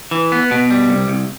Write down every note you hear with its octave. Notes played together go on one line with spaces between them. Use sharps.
E3
B3
B2
G3
C2
C2